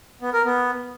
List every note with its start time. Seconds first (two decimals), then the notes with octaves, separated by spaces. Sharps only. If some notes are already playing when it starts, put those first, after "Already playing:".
0.21 B3
0.33 A#4
0.45 B3